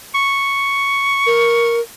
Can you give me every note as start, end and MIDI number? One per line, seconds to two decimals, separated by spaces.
0.15 1.76 85
1.26 1.81 70